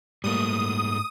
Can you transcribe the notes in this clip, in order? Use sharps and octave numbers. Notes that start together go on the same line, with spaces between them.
G#2 G3 A3 A#3 D#6